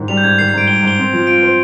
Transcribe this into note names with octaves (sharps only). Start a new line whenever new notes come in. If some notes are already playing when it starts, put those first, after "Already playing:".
Already playing: G#2 D#3
G3 F7
G6
G#2 G#6
D#3 C7
C7
G#2 D7
G3 G7
G#2
G7
C4
F3
F4 D7
C5